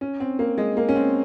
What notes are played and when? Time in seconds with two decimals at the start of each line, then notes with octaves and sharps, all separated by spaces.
0.01 C#4
0.20 C4
0.39 A#3
0.58 G#3
0.77 A#3
0.89 C#4
0.96 C4